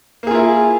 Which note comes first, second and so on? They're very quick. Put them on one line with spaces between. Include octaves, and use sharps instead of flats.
A#3 G#4 F4 E4